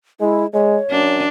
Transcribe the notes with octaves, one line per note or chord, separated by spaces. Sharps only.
G#3 E4
G#3 C#5
F#2 D4